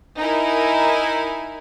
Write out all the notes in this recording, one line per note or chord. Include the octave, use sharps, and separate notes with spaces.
D#4 E4 A#4 G#5